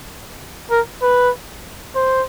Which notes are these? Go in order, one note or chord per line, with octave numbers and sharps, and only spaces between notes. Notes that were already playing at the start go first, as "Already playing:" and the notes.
A#4
B4
C5